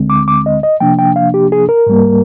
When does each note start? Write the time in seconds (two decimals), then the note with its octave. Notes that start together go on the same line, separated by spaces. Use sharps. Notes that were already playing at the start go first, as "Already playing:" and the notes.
Already playing: D2 D3 G#3 C4
0.10 D6
0.28 D6
0.46 D#5
0.63 D#5
0.80 C3 F3 A#3 D4 G5
0.99 G5
1.16 F5
1.34 G4
1.52 G#4
1.69 A#4
1.87 G#2 G3 A#3